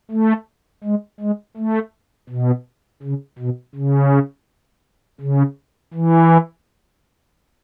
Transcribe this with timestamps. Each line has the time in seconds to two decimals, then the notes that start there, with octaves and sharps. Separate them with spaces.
0.11 A3
0.84 G#3
1.20 G#3
1.57 A3
2.30 B2
3.03 C#3
3.39 B2
3.75 C#3
5.21 C#3
5.94 E3